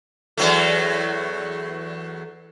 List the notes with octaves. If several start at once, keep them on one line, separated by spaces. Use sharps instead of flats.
E2 F#3 A3